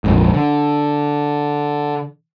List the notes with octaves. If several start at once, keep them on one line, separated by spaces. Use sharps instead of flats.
A#1 F2 G#2
D3